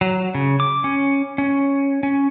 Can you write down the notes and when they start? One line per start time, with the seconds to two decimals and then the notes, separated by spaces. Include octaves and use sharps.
0.01 F#3
0.35 C#3
0.60 D6
0.84 C#4
1.38 C#4
2.03 C#4